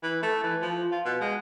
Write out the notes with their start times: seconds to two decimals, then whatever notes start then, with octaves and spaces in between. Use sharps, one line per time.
0.03 E3
0.23 A3
0.43 E3
0.62 F3
0.91 F4
1.05 B2
1.20 G#3